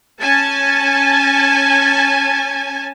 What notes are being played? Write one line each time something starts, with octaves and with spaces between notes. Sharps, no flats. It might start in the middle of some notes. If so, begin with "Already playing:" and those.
C#4 G#5 A5